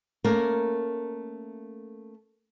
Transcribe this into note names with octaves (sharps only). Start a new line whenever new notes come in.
A3 A#3 C#4 A#4